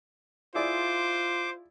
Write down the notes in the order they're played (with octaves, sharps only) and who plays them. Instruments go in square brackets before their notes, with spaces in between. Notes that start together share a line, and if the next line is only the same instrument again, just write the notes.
[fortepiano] E4 G#4 D5 [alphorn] F4 [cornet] C5 [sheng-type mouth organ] D6